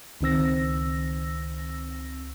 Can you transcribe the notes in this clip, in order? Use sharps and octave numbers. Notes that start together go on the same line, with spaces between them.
C#2 D#3 C4 E6 A#6